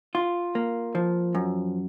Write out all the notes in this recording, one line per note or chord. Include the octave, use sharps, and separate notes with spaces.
F4
A#3
F3
F#2